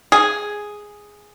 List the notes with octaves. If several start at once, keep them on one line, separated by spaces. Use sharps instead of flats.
G#4